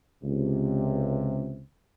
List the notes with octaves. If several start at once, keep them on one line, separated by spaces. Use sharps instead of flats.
C#2 C3